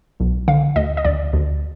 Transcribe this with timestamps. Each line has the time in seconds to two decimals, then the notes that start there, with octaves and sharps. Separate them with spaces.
0.20 B1
0.48 D3 F5
0.76 D2 D#5
0.97 D#5
1.05 D2 D5
1.33 D2